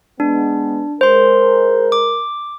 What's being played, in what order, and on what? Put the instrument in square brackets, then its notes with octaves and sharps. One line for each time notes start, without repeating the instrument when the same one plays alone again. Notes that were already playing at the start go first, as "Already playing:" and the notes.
[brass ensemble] G#3 B3 [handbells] D4
[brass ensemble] G#3 A#4 [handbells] C5 C6
[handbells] D6